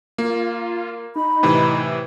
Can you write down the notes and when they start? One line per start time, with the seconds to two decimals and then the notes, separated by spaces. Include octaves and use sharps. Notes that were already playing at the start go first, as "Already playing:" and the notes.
0.18 A#3 F4
1.16 D#4 B5
1.43 A2 C3 E3